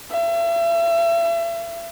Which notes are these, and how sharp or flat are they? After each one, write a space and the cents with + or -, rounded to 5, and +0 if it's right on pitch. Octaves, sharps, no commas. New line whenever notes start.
E5 +40